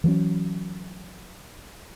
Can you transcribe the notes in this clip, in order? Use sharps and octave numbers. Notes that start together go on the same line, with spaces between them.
E3 F#3 B3 C#4